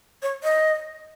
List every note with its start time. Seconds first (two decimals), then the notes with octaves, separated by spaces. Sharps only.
0.22 C#5
0.43 D#5